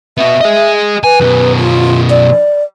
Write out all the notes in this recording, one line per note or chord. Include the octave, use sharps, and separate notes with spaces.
B3 F#4 E5
G#4 D#5
B4 G#5
F#2 B2
F4
D5